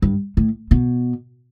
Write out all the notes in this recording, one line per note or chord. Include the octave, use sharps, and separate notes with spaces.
G2
A2
B2